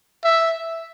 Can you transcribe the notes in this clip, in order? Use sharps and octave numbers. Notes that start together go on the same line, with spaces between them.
E5